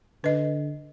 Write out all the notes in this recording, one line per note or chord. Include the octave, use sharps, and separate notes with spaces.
D3 B4 D#5